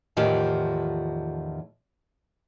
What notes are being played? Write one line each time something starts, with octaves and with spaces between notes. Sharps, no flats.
E2 A2 D#3 F3 F4 G4